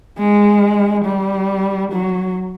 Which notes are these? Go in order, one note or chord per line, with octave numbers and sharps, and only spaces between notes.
G#3
G3
F#3